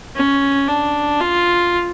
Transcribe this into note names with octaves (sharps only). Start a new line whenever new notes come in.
C#4
D4
F4